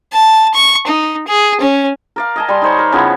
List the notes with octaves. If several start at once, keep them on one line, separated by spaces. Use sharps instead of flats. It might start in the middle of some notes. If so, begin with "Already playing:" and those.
A5
C#6
D#4
G#4
C#4
A#4 D5 F5
D#5 G#5 A5
G3 C6
D#4 C5 C#5
A#4
C#3 F3 B3 E4